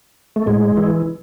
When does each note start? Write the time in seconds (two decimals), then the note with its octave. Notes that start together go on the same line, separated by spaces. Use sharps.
0.36 A3
0.47 A2 G#3
0.77 E3